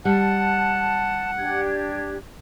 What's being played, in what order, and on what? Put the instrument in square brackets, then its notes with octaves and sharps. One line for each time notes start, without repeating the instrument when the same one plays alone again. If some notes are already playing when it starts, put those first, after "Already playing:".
[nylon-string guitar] G3 [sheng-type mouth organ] F#5 [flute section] A5
[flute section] D4 G4 G#6